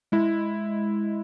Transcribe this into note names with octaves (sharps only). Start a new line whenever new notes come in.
G#3 E4